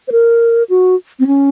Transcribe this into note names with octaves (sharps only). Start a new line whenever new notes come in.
C5
A#4
F#4
C4
C#4